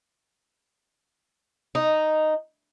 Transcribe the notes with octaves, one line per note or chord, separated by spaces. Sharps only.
D#4